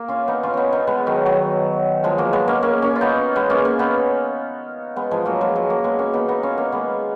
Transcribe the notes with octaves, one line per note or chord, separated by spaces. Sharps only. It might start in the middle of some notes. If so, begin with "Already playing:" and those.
Already playing: A#3
C#4 F4
B3 D#4
C#4 F4
B3 C#4 D#4
B3 D#4
G#3 B3
D#3 F#3
D#3 F#3
F3 G#3
F#3 A#3
G#3 B3
A#3 C#4
A#3 C#4
A#3 C#4
F4
B3 D#4
G#3 B3
A#3 C#4
A#3 C#4
B3 D#4
G#3 B3
F3 G#3
F#3 A#3
F3 G#3
F#3 A#3
F#3 A#3
G#3 B3
A#3 C#4
B3 D#4
B3 D#4
C#4 F4
A#3 C#4
G#3 B3